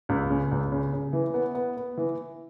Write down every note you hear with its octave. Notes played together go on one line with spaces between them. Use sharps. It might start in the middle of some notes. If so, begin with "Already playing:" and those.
C#2
C#3
C#2
C#3
C#3
E3
B3
B3
B3
E3